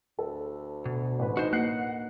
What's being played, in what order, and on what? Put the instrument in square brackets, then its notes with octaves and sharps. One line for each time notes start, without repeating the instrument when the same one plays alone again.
[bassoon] D2 [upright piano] A4
[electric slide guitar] B2
[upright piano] A1 B4
[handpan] D#4 D#5 [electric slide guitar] F#4 C5
[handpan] A#3 D4 B4 [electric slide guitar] F#5 [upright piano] F#6 C7